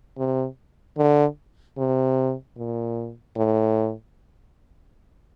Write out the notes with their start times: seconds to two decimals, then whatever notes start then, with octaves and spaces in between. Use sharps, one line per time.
0.17 C3
0.97 D3
1.77 C3
2.57 A#2
3.36 A2